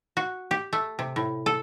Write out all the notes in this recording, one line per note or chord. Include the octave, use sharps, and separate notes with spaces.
F#4
G4
A3
C3
A2
A4